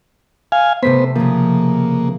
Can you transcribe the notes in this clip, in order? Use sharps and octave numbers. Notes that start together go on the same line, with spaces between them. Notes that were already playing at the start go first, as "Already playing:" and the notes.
F5 G#5
C3 A3 B3 C5 B6
C#3 F3 A#3